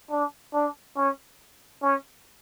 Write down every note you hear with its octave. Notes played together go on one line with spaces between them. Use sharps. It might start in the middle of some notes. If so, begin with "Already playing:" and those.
D4
D4
C#4
C#4